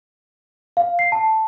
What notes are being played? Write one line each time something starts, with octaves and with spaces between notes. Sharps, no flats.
F5
C7
A5